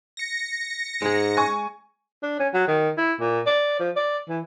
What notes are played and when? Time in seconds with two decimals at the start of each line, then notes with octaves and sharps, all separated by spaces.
0.17 A#6 C#7
1.02 G#2 G#3 G#4
1.37 G#5 C#6
2.23 D4
2.39 C#4
2.54 F#3
2.68 D#3
2.97 E4
3.20 A#2
3.46 D5
3.79 F3
3.96 D5
4.29 E3